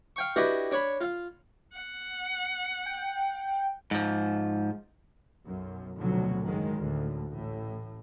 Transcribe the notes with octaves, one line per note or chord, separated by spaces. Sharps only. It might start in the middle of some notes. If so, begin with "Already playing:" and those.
F5 G5 C#6
D4 E4 F#4 G4 B4 D#5
D4 C#5 B5
F4 F5
F#5
G5
G#2 F3
B1 F#2
F1 D2 B2 F#3
F#1 G#2 D#3 G#3
D2 A2
A1 A2